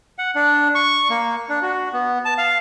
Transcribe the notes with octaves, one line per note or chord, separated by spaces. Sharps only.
F#5
D4
C#6
A#3
D4
F#4
B3
A5
F5